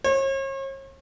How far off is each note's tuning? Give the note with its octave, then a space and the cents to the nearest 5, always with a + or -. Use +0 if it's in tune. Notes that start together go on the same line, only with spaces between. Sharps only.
C#5 -40